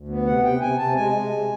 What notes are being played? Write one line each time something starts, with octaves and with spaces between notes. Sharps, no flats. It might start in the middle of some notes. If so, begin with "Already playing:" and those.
Already playing: D2
B3
C3 F#5
C3 G5
C3 G#5
C3 A5
G#3 G#5
G#3
C3